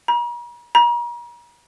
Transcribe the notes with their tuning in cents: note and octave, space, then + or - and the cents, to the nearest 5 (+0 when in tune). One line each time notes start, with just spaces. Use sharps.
A#5 +45
A#5 +40